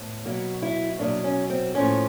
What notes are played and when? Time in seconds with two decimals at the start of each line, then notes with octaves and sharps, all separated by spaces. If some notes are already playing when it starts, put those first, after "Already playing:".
Already playing: A2 B3
0.25 B2 F#3 A#3 F#4
0.62 E4
0.99 B2 F#3 A#3 D4
1.24 C#4
1.50 C4
1.74 A2 F3 A#3 C#4